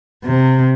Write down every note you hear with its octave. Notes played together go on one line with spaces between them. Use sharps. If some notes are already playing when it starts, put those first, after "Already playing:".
C3